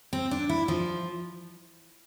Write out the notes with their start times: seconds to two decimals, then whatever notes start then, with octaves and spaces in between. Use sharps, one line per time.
0.13 C4
0.31 D4
0.49 E4
0.68 F3